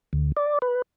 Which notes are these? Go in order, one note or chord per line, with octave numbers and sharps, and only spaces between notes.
D2
D5
B4